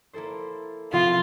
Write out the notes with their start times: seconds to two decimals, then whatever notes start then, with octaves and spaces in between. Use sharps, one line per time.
0.13 A#3 E4 A4 C5
0.92 C3 F3 C4 E4 F4